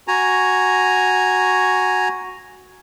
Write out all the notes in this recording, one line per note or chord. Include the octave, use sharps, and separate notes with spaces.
F#4 G#5 A#5